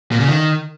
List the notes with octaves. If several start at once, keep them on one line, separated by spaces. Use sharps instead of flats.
A#2
C#3
D#3